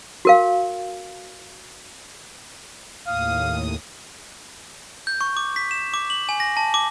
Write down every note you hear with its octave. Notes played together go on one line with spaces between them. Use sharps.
F#4 A#4 F5
D#2 A2 F5 D#6
G6
C#6
D6
B6
E7
D6
F#7
G#5
A#6
A5
D6